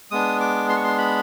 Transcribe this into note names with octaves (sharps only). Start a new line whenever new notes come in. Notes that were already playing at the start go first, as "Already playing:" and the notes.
G#3 B3 D4 D#6
D6
C6
C#6
C6
B5